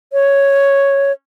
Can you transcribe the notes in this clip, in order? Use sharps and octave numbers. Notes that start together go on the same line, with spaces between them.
C#5